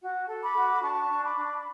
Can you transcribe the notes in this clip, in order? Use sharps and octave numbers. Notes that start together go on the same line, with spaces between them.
F#4
A4
B5 D6
F#4
D4 A5 C#6
D4
B5 D6
D4